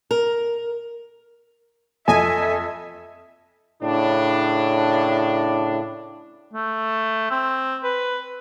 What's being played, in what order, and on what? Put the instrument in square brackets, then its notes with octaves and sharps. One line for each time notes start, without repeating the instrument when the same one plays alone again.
[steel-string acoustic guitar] A#4
[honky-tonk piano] F2 D#5 A5 [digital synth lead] A4 [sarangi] E5 [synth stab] G#5
[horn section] A2 C#3 D4
[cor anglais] A3
C4
B4